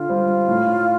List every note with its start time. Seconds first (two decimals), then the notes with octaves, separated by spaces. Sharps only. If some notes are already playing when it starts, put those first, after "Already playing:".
Already playing: D3 F4
0.09 G3 C4
0.48 A2